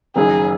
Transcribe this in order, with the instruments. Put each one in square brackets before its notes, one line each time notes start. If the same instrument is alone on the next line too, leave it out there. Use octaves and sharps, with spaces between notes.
[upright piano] F#1 F#2 D#3 [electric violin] G#4